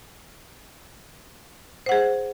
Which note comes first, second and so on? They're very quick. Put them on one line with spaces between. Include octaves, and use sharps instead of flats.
C5 F#5 G#4